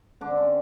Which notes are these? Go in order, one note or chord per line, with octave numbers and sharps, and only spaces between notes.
D3 D4
C4
D3 C#4